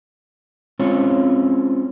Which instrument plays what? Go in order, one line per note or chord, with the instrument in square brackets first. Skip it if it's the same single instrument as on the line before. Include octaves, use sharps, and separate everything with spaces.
[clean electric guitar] G#3 C4 C#4 F4 C#5